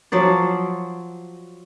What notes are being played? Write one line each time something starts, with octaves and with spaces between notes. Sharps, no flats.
F3 F#3 C5 D5